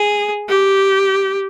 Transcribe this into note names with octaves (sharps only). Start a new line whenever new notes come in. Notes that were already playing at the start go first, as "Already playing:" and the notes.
Already playing: G#4
G4